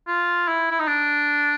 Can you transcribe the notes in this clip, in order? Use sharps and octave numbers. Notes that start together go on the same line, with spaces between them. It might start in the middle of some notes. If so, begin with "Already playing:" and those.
F4
E4
E4
D#4
D4